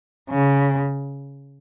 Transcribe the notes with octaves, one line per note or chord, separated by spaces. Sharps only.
C#3